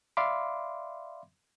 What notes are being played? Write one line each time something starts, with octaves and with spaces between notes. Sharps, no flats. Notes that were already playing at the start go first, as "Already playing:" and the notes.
D5 E5 F5 B5 C6 D6